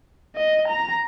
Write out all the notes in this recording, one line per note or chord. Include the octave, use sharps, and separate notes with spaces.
D#5
A#5